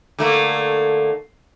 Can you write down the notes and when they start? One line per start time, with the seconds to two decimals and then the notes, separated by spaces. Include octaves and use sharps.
0.19 D3 A3 A#3